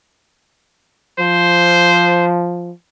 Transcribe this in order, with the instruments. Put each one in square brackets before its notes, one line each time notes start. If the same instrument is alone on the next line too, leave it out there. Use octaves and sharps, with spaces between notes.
[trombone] F3 [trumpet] C5